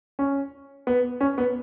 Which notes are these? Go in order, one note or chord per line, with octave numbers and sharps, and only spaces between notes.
C#4
B3
C#4
B3